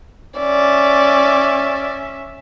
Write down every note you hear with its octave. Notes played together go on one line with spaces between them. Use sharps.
C#4 D5 E5